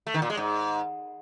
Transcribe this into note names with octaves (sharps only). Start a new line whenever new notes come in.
A3
D#3
A#2
G#3
G#2